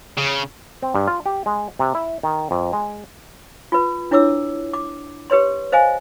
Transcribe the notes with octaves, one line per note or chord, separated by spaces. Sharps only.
C#3
C4
G2
F4
G4
G#3
C3
E4
D#3
F2
G#3
F4 B4
D4 E4 C#5 D6 E6
D6
G4 B4 C#5 C6
C5 D#5 F5 G#5